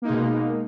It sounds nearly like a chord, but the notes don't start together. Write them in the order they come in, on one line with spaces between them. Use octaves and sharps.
A#3 D#4 G#3 B2